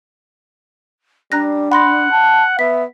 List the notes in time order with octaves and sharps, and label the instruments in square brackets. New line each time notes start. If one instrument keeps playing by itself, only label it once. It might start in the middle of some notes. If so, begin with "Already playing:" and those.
[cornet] G3 [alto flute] D4 [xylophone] A#5 F#6 A#6
[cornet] F#5 [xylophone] B5 C6 A#6
[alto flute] A5
[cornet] B3 [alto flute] E5 [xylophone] B6